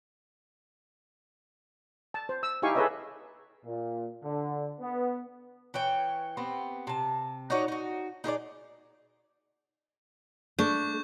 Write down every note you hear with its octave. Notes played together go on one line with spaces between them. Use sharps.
A5
C5
E6
D#4 E4 G4 F5 G#5 C#6
G#4 A4 B4 C#5 D#5 E5
A#2
D3
B3
E3 C#5 G5
B3 C4 G4
C3 A5
D#4 F#4 C#5 D5
D#4 F#4
D#4 G#4 A#4 D5
A3 D4 C#6 G6